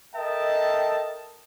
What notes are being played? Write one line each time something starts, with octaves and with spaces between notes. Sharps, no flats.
A4 A#4 D#5 E5 G5 A5